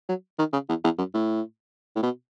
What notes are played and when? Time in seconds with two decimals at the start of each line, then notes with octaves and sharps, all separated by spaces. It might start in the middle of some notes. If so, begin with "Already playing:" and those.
0.09 F#3
0.39 D#3
0.53 C#3
0.69 E2
0.84 E2
0.98 F#2
1.14 A2
1.96 A2
2.03 B2